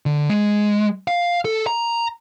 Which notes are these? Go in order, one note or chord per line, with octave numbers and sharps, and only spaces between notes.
D3
G#3
F5
A4
A#5